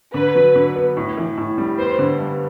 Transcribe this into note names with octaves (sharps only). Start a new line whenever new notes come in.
D3 B4
F#3
D3
B3
A2
E3
A2
G3
B3 C5
D3
G2